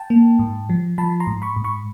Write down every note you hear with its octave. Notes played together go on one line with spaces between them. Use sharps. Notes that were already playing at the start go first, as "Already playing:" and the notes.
Already playing: G5 A5
A#3
G#2
F3
F3 A5 B5
A#5 C6
G#2
B5 C#6
G#2
B5 C#6